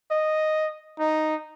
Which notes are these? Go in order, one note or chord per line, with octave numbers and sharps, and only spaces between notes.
D#5
D#4